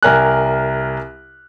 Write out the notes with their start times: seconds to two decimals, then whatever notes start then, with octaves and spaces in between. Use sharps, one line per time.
0.03 C2 A#4 G#5 F#6